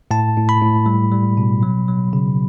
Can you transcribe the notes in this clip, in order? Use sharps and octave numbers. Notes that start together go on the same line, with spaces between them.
A2 A5
A2
B5
A2
G3
G3
B2
F#3
F#3
C#3